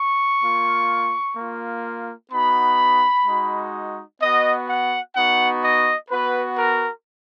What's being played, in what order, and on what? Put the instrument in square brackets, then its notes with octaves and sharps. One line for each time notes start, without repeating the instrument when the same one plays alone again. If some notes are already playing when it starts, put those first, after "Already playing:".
Already playing: [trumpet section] C#6
A#3 F4
A#3 F4
B3 D#4 F#4 B5
G#3 D#4 F#4
B3 F#4 D#5
F#5
B3 D#4 F#4 F#5
D#5
B3 F#4 B4
A#4